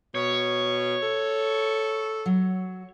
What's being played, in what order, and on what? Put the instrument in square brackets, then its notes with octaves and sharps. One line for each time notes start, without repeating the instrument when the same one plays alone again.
[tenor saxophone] B2 [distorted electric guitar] C#5
[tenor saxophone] A4
[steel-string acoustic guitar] F#3